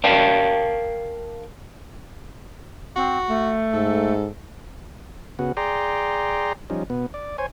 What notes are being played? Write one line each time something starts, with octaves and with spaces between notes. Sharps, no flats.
A#4 F5 G5 A5
C4 F#4
A3
G#2 A4
C#3 B3 F#4
G#4 D5 G5 A#5 C6
F3 G3 C#4 D#4
B2 B3
D5
C5 C#5 G#5